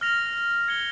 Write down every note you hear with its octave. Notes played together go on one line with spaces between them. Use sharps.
F6 A#6 F7
G#6 C#7 G7